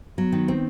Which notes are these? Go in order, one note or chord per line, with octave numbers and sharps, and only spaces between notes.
F#3 B3
D#3
C4